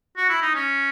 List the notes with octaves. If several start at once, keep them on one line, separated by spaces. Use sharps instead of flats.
F#4
E4
D#4
C#4